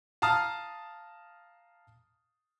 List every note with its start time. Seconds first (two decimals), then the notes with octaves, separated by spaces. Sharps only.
0.22 F5 A5 A#5 D#6 F6